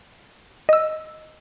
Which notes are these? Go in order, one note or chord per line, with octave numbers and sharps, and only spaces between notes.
D#5 E6